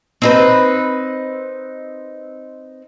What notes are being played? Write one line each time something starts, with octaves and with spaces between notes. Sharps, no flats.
C4 D#4 B4